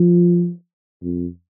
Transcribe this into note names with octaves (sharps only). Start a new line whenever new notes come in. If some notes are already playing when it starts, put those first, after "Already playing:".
Already playing: F3
F2